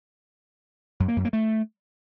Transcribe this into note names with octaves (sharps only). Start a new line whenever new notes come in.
F#2
A#3
F#2
A#3
A3